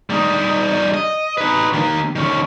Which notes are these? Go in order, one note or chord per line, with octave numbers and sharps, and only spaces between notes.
G3 D#4
D#5
D#4 B4
D#3 A#3
D#3 C#4